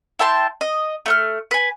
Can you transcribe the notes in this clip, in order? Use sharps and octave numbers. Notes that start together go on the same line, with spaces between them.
E4 G5 A5 C6
D#5
A3 F#5 F6
B4 G#5